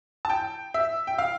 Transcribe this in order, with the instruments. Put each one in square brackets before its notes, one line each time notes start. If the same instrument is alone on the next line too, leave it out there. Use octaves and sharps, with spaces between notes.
[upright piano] A5
G5
E5
G5
F5